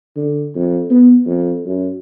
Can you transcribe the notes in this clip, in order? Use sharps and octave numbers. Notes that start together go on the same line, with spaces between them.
D3
F2
B3
F2
F#2